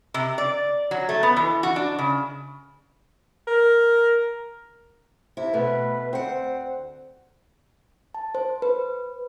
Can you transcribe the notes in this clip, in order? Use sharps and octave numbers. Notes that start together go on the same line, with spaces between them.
C3
D5
F#3
A3
B3
E3
F#4
D4
C#3
A#4
C3 E4
B2 A3 B3 B4
D2 C4 F#5
A5
C5
B4